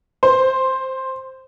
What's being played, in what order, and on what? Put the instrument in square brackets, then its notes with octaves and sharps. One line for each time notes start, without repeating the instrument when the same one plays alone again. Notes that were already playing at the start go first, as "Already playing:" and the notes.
[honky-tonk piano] C5